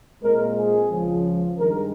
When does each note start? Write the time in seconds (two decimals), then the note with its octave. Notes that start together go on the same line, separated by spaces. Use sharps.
0.23 A#2 G#3 C4 A#4
0.57 G#4
0.90 C#2 C#3 F3
1.58 G2 D#3 G#3 A#4